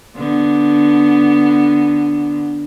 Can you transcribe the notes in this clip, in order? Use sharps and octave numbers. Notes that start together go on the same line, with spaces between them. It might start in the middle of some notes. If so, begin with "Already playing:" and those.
D3 B3